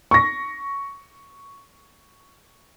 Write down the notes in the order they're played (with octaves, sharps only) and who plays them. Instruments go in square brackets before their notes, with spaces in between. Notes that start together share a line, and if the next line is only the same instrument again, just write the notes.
[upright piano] C#6 A#6